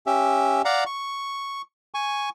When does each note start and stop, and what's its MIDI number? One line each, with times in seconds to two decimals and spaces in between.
0.06 0.62 61
0.06 0.62 67
0.06 0.62 76
0.65 0.84 74
0.65 0.84 77
0.65 0.84 78
0.65 0.84 82
0.86 1.62 85
1.94 2.29 80
1.94 2.29 85